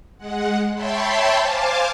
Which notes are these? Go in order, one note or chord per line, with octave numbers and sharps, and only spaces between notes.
G#3 F#5
C#5 E5 G5 A5 B5 C6
C5 F5 G#5 A5 D6